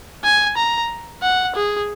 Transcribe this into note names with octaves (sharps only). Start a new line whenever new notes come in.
G#5
A#5
F#5
G#4